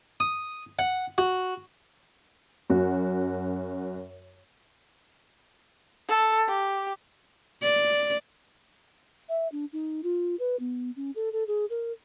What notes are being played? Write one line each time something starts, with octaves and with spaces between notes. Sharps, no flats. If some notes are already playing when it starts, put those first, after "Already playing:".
D#6
F#5
F#4
F#2 F#4
A4
G4
D5
E5
D4
D#4
F4
B4
B3
C#4
A4
A4
G#4
A#4